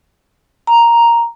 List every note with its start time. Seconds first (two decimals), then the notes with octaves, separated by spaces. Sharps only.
0.67 A#5